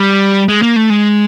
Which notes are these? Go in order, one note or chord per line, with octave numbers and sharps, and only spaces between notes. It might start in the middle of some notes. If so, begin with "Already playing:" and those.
Already playing: G3
G#3
A#3
A3
G#3